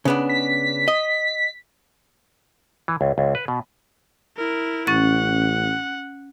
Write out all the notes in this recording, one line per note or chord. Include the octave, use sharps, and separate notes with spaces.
C#3 B3 D4
B6
D#5
E3
C#2
C#2
B4
B2
E4 A#4
A1 C#4 F#5 A6